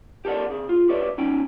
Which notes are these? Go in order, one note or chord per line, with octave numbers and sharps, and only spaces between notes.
G4 A4 A#4 D5 F#5
C3 G#4
F4
F#4 G4 B4 C#5 D5 E5
C#4 D#4 G5